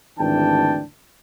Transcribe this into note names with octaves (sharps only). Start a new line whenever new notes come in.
G#1 D2 E3 D4 G5 A5